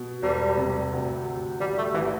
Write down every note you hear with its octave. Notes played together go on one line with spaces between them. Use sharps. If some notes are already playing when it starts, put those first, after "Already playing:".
Already playing: B2
E1 G3
C3
D2
D2
A1 G3
A3
A1 E3